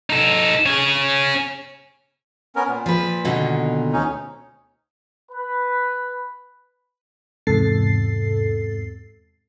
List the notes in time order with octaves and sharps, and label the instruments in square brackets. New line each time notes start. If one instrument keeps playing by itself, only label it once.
[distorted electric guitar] D#4 A4
C#4 G#4
[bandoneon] B3 C#4 A#4
A#2
[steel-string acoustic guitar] F3 B4
B2 D3 D#3
[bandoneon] D2 C#4 D#4
[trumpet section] B4
[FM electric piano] E2 G#2 C3 A4 A6 C7